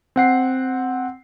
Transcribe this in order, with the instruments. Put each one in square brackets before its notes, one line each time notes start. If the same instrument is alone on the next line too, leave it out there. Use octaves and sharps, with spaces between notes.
[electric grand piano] C4 F#5 C7